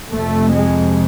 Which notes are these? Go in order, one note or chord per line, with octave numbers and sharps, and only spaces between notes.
F2 C3 A3
G#3